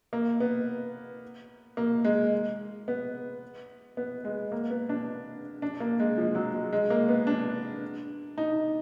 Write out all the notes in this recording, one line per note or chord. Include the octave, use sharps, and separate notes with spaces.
A#3
B3
A#3
G#3
B3
B3
G#3
A#3
B3
D4
D4
A#3
G#3
F3
F#3
G#3
G#3
A#3
B3
D4
D#4